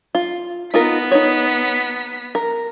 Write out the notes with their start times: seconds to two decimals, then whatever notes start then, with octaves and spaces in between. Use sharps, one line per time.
0.15 F4
0.74 B3 D#4 F4 A#4 B6
1.11 D#4 C#5
2.35 A#4